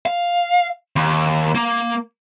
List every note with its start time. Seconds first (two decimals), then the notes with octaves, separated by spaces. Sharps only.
0.06 F5
0.96 D#2
1.55 A#3